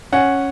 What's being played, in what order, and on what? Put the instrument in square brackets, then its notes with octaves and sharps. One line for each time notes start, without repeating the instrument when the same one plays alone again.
[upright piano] C#4 F#5